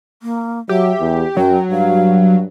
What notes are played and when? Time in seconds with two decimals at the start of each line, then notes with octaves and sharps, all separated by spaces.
0.22 A#3
0.69 F#3 G4 E5
1.01 E2
1.37 F#2 F#3 G5
1.71 G2 F5